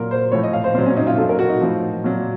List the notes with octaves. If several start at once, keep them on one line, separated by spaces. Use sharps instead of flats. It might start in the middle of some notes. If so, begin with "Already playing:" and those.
Already playing: A#2 F#3 A#4
C5
A2 F3 C#5
D#5
F5
C5
A#2 F#3 C5
C#4
D#4
F4
A#2 F#3 A4
A#4
F#4
D#4
A2 F3
A#2 F#3